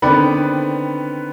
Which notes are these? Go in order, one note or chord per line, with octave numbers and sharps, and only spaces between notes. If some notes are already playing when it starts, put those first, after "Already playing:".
D3 D#3 B3 C4 B4 D5